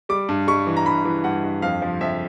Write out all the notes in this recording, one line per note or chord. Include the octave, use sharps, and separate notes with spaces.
G3 D6
G2
G3 C#6
E3
A#5
G2 B5
E3
G2 F#5
G2
F2 F5
F3
F2 E5